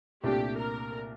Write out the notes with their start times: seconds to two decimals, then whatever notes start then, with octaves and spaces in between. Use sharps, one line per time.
0.24 C2 A#2 A3 D4 G4
0.58 A#4